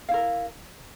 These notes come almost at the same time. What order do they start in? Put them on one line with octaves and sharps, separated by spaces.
F5 E4 A#4